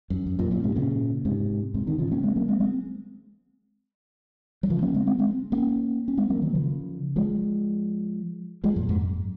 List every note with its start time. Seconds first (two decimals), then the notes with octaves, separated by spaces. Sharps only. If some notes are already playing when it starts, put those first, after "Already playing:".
0.10 F#2
0.27 F#2
0.39 F#2 A#2
0.51 F#2 A#2
0.63 G#2 C3
0.75 A#2 C#3
1.25 G#2 C3
1.74 G#2 C3
1.87 C3 D#3
1.99 C#3 F3
2.11 A#3 C#4
2.23 G#3 C4
2.36 F#3 A#3
2.48 G#3 C4
2.60 G#3 C4
4.63 F#3
4.70 C#3 F3
4.82 A#3 C#4
4.94 G#3 C4
5.07 G#3 C4
5.19 G#3 C4
5.52 A#3 C#4
6.08 C#4
6.17 G#3 C4
6.30 F#3 A#3
6.42 D#3 F#3
6.55 C#3 F3
7.16 F3 G#3
8.64 F3 G#3
8.76 F#2 A#2
8.89 F2 G#2
9.01 F#2